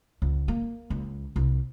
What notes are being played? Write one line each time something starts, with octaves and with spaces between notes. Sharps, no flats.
C#2
A#3
C#2
C2